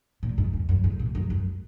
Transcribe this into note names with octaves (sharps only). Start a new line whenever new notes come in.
A#2
G#2
E2
F#2
G#2
A#2
F#2
F#2